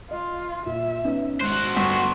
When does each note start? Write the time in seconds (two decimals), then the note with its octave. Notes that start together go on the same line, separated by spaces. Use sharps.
0.11 F4 D#5
0.66 A#2 E5
1.04 B3 C#4 D#4
1.41 G#1 F#4 C5 F#6
1.77 G1 G2 C#6